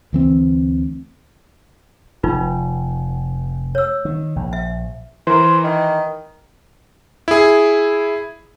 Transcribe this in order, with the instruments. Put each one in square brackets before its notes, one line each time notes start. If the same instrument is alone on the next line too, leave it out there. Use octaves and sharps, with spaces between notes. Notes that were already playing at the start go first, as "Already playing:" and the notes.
[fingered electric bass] D2 E3 C4
[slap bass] F1 [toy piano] D#4 F4 B4
[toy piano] C#5 E6
[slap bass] D#3
A#1
[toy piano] E5
[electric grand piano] E3 A#4 [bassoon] C5
[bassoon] D#3
[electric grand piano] E4 G#4